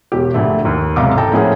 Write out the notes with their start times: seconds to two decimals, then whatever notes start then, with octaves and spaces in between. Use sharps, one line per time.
0.12 E1 G4
0.34 A#1 D3 A3
0.65 D#2
0.96 F#1 C2 G#2 F5 D6
1.18 A4 G5 A5 A#5
1.32 A2 F3 A#3 C#4 G#4 F#5